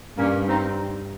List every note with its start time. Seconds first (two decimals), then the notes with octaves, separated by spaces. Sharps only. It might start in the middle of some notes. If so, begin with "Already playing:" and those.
0.18 G2 A#3 C#4
0.49 C4 D#4